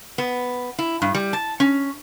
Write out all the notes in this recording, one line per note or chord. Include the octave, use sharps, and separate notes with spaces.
B3
E4
G2
G3
A5
C#4